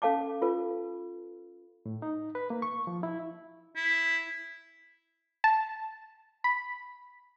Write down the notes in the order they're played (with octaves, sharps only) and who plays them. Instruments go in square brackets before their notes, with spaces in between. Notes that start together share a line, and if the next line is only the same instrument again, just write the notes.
[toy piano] C#4 A4 F5 A5 D6
F4 A4 B4
[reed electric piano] A2
D#4
B4
A#3
C#6
F3
E4
[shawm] E4
[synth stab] A5
B5